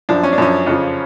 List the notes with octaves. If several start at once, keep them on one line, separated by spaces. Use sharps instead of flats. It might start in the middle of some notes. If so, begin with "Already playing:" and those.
F#2 F3 D4
C#4
D4
F#2 F3 C#4
F2 C#3 F3